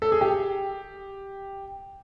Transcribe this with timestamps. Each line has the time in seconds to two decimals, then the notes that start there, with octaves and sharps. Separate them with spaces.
0.02 A4
0.12 G#4
0.21 G4